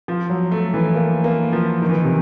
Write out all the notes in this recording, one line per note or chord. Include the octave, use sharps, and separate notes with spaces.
F3
F#3
A3
E3
A#3
A#3
F3
D#3
E3
D#3
C3